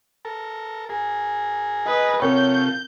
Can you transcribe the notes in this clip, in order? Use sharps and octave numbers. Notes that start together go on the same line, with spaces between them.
A4 A#4
G#4 A#4
B4 D#5
C3 C4 F4 A4 A#4 C#5 G5 G6